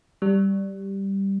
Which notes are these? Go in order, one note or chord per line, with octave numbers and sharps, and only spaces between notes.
G3